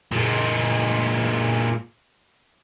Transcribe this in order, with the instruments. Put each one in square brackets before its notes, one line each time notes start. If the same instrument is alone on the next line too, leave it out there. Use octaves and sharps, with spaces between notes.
[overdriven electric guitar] A#2 G#3